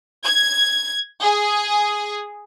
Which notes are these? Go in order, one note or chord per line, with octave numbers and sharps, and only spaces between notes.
G#6
G#4